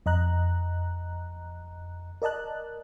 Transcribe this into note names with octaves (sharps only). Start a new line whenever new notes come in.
F2 D#5 A#5 F#6
A#4 D5 D#5 A5 F#6